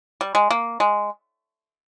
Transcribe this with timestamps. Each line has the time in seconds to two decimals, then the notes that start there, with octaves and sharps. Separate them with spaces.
0.21 G3
0.35 G#3
0.51 A#3
0.80 G#3